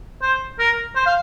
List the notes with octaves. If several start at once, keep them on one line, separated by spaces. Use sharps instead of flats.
C5
A#4
C5
F5